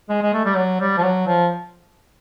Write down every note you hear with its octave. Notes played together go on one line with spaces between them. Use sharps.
G#3
G#3
A3
G3
F#3
G3
F3
F#3
F3